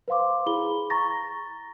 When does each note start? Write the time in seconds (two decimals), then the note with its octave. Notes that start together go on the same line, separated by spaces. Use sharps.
0.08 B4 C5 F5 C6 D6
0.46 E4 G#4 B5 G7
0.90 A#5 C#6 A6 A#6